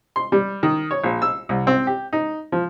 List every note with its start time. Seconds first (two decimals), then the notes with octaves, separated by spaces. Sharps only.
0.16 C6
0.32 G3
0.63 D#3
0.91 C#5
1.04 A#1
1.22 E6
1.49 C2
1.67 C4
1.87 G4
2.13 D#4
2.52 F3